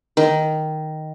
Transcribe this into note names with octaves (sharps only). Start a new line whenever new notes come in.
D#3